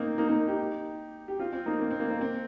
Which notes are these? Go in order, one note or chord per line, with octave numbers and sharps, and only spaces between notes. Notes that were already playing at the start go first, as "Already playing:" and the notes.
Already playing: A#3 C4 D#4
A#3 D#4
A#3 D#4
D#4 G4
G4
C4 F4
C4
A#3 D#4
A#3
C4
A#3
A#3
C4